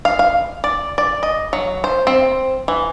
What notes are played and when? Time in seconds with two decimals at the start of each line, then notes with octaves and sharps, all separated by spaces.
0.05 F5
0.19 F5
0.64 D5
0.98 D5
1.23 D#5
1.53 F#3
1.84 C5
2.07 C4
2.68 E3